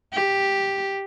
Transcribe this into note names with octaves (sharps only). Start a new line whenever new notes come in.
G4